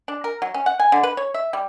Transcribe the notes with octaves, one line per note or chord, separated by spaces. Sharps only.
D4
A#4
F#3
C#4
F#5
G#5
D3
B4
C#5
E5
G3